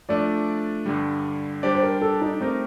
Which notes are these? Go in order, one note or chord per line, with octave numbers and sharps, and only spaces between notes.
F3 A3 D4 D5
G2 D3 G3
G3 D4 G4 C5 D5
C5
A#4
A4
D#4
A3 C4 D#4 G4 A#4